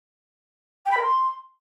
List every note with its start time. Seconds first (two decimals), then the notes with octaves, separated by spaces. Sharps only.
0.85 G5
0.91 B5
0.96 A#4
1.02 C6